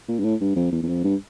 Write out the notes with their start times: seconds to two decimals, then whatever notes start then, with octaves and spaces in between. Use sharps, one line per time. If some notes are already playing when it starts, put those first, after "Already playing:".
0.08 A#2
0.19 G2
0.24 A2
0.41 G2
0.56 F2
0.72 E2
0.83 E2
0.89 F2
1.04 G2